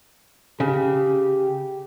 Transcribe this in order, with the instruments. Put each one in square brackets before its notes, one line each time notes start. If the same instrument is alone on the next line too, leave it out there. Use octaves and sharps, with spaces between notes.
[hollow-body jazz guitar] C#3 [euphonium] G4